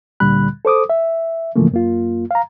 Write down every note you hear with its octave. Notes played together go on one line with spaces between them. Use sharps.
D2 A#2 D3 G3 B5 F#6
A4 C5 D6 D#6
E5
G#2 C#3 E3 F3 A3 A#3
F#2 A#3 F4
F5 A#5